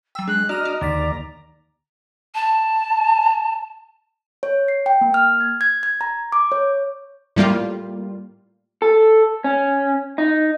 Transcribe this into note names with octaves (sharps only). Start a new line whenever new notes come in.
F#3 G5 E6
G#3 D4 F#6
D4 F#4 D#5 A#5 F6 F#6
F#4
D#2 D3 D5 A6 B6
A5
C#5
C7
G5
A#3
F6
G#6
G#6
G#6
A#5
D6
C#5
A2 G3 A#3 F4
A4
C#4
D#4